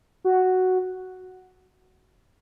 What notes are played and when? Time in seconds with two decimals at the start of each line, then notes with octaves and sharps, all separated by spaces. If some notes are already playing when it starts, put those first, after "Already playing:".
0.24 F#4